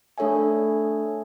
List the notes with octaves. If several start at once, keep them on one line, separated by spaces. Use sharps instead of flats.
A3 D4 A4 C#5 E5 G#5